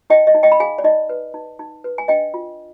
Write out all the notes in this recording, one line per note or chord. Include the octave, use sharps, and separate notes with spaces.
D#4 D#5 G5
D#5
D#4
D#5 G5
B5
G#4 F5 G#5
D5
D#4 D#5
B4
D#4
D#4
B4
G#5
D4 D#5 G5
F4